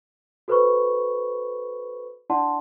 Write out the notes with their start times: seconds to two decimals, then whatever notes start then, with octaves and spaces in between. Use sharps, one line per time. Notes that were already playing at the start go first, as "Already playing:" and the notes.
0.48 F#4 A4 B4 C5 B5 C#6
2.30 D4 E4 D5 F#5 A5 C6